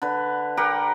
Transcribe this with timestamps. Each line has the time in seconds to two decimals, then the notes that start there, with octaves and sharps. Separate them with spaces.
0.02 D3 B4
0.57 G4 A#4 B4 F#5